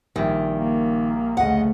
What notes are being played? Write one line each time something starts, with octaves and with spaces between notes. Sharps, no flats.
A#1 D#3 G3 E5
A#3
D2 C#3 A3 D#5 F#5